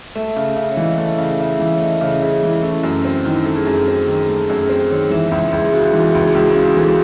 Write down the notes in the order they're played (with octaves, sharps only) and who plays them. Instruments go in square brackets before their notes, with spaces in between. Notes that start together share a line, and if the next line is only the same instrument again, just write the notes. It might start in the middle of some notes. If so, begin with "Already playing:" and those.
[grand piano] A3 [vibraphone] E5
[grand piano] C#3
C#3
[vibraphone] C#5
[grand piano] E3 [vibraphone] D#5
[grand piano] A3
C#3
[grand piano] C#3 [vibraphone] E5
[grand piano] E3 [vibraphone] E5
[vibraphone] C#5
[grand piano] A3 [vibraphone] D#5
[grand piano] C#3 [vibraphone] C#5
[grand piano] C#3 [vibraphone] G#4
[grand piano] E3 [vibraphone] E4
[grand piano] A3 [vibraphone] C#4
[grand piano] F#2
C4
[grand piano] D#3 [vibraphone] E4
[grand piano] A3
[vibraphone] G#4
[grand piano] F#2
C4
D#3
A3
[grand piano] F#2 [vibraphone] G#4
[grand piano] C4
[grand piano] D#3 [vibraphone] C#5
[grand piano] E3 [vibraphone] E5
[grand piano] C#2
[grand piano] C#2 [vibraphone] G#4
[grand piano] C#3 [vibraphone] F#4
[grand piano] E3
C#2
[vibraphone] G#4
[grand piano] C#2 [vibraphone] F#4
[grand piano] C#3 [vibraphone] G#4
[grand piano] E3 [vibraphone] A4